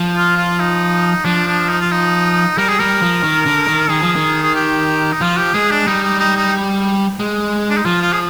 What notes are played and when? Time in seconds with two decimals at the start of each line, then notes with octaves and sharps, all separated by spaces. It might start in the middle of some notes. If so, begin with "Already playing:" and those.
Already playing: F3
0.16 F4
0.37 F4
0.59 D#4
1.25 F3 D4
1.47 D4
1.69 D#4
1.81 F4
1.91 D#4
2.58 G3 A#4
2.69 G#4
2.79 G3 A#4
3.02 F3
3.23 D#3
3.46 D3
3.68 D#3
3.89 D#3 G#4
4.02 F3
4.16 D#3
4.43 G#4
4.55 G4
5.12 D#4
5.21 F3 F4
5.38 G4
5.54 G#3 G#4
5.71 D4
5.87 G3 D#4
6.04 D#4
6.20 D#4
6.37 D#4
7.19 G#3
7.70 D4
7.77 D#4
7.85 F3 F4
8.02 F4
8.13 G#4